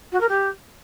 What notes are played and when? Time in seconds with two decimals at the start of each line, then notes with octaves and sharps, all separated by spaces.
0.12 F#4
0.20 A#4
0.28 G4